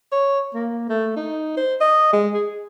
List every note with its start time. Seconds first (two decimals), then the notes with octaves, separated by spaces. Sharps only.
0.12 C#5
0.54 A#3
0.89 A3
1.16 D#4
1.57 C5
1.81 D#5
2.13 G#3
2.34 G#4